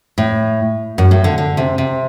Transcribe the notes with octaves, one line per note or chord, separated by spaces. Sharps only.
A2
F#2
A2
D3
D3
C3
C3